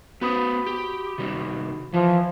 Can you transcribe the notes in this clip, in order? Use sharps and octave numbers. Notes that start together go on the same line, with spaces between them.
B3 F#4 B4 C5 B5 D#6
G4
C3 D#3 G3
E3 F3